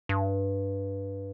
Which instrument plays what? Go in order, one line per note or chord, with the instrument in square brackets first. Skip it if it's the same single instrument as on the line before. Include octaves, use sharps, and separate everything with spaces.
[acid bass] G2